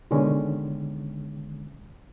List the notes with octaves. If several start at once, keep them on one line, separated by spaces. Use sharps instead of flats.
B2 D3 D#3 G#3 C#4